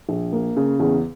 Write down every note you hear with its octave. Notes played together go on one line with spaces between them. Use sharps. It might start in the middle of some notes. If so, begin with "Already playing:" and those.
A#1
A#3
C#3
E2